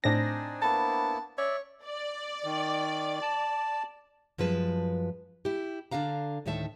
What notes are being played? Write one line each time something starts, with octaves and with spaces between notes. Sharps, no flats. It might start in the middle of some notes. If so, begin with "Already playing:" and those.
A2 C4 D4 D#4 G#5 A#6
A#3 B3 E4 A5
C#5 D5 E5
D5
D#3
A5
F#2 F3 G#3 B4 A5
E4 G4
D3 D4 G4 F5 A#5
D2 A2 D#3 C#5 E5 A5